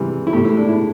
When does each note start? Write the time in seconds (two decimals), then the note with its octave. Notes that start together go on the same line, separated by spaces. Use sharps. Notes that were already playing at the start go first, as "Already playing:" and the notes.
Already playing: C3 E3 G3
0.27 E4
0.33 A3 G4
0.37 A2
0.45 E4
0.57 D4
0.69 E4